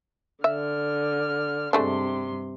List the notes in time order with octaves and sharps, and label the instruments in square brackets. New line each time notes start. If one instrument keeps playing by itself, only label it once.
[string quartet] D3 F6 [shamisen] E5
[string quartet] G2 C3 C6 [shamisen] G#3 A3 D4